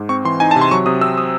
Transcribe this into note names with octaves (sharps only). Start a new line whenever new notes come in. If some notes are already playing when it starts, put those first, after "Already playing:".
Already playing: G#2
C4 C#6
E3 C6
D#4 G#5
A5
C3
C6
F#3 C#6
C3 D#6
C4 E6
D#6